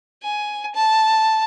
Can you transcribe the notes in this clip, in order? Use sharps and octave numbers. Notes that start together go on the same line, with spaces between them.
G#5
A5